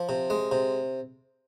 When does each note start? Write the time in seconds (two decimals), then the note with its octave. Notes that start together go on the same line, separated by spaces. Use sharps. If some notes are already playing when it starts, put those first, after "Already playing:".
Already playing: F3
0.09 C3
0.30 G#3
0.52 C3